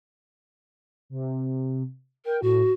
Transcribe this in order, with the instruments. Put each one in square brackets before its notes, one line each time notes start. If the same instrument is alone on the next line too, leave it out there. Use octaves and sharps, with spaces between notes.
[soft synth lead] C3
[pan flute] A#4 [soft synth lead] G5
[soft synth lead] A2 [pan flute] F#4